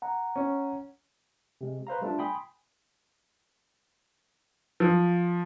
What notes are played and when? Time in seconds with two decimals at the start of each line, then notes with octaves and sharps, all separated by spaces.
0.02 F#5 A#5
0.36 C#4
1.61 C3 G#3
1.87 B4 C5 F5 A#5
2.01 G3 A3 B3 D4 F4
2.19 G5 G#5 B5 C6 D#6
4.80 F3